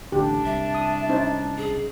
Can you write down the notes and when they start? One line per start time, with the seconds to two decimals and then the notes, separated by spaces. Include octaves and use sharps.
0.12 A1 D3 D4 G4 A5
0.45 C2 E5
0.75 D#6
1.09 C#4 D#4 C5
1.58 G#4